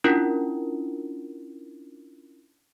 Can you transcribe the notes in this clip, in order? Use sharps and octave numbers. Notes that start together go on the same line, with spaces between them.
C#4 D4 E4 F4 A#4